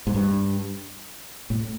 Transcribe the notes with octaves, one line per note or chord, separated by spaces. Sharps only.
G#2
G2
A2